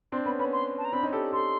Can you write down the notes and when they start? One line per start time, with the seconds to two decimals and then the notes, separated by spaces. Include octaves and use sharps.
0.12 C4 D4 C6
0.26 B3 C#4 B5
0.39 B3 C#4 B5
0.53 C6
0.78 A5
0.85 A#5
0.92 C4 D4 B5
1.03 C#4 D#4
1.12 G4 A4
1.33 G4 A4 C6